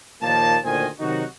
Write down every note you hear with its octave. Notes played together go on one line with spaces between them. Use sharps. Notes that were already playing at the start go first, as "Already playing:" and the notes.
D#2 A#2 F3 A#3 D#4 A5
D2 A#2 D#3 C5 D#5 G#5
C3 D#3 F#3 D#4 F#4